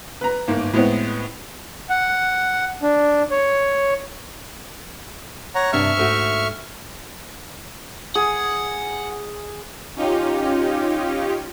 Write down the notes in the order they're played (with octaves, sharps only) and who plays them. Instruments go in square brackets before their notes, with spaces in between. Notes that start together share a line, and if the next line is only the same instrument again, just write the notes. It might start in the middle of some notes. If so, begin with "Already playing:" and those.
[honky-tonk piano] B4 A#5
G1 G#2 A#3
A2 G#3 B3 C4
[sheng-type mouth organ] F#5
D4
C#5
C#5 F#5 A#5
[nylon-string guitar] G2 C3 D4 [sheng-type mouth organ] E5 C#6 F6
[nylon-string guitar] G#2 A3 F#4
[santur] G#4 [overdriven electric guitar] F#5
[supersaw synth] C#4 D#4 F4 G4